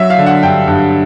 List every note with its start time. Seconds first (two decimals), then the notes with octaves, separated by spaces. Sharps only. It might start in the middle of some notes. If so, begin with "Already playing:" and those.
Already playing: F#3 E5
0.10 F5
0.18 D3
0.26 F#5
0.43 G2 G5
0.67 G2